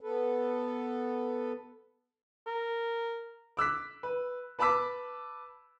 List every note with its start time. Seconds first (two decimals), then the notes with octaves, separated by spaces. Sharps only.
0.01 B3 A4 B4
2.46 A#4
3.57 D6 E6 F#6 B6
4.03 B4
4.59 B4 A5 B5 D6 E6 B6